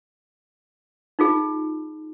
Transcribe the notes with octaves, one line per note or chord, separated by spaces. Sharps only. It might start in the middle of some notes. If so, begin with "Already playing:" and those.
D#4 F4 G#4